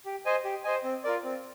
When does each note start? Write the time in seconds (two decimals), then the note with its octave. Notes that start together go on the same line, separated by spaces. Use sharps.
0.06 G4
0.26 C5 D#5 G#5
0.44 G4
0.64 C5 D#5 G#5
0.84 C4
1.04 F4 A#4 D5
1.24 C4